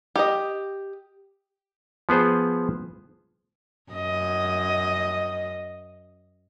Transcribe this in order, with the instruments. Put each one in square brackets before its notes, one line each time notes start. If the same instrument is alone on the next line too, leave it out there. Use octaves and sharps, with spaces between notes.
[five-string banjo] G4 D#5
[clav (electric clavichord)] F3 B3 G#4 C5
[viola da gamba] F#2 D#5